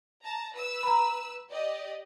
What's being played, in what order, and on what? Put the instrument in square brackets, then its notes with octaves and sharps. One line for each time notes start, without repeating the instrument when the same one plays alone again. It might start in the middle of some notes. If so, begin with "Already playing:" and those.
[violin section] A5 A#5
B4 E6
[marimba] A#5 B5
[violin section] G4 D5 D#5